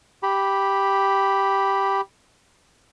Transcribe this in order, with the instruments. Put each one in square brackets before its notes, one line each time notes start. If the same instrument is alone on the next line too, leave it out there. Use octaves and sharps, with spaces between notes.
[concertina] G4 B5